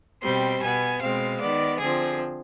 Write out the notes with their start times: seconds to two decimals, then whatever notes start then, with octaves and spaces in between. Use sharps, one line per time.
0.22 B2 G3 C4 C6
0.62 B2 B3 G#5
1.01 B2 G#3 C4 F5
1.40 D#3 B3 D5
1.80 D3 F3 C4 G#4